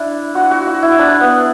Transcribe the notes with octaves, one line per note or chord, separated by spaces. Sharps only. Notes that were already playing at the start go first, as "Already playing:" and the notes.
Already playing: D4 E4
F#4
F#4
F#4
E4
D4
B3